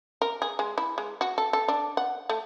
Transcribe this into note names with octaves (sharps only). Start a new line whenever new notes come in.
A#4
G#4
G#3
E4
G#3
F#4
A4
A4
D4
F#5
A3